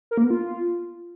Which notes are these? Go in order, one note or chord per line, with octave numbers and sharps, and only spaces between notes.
A#4
A#3
B3
F4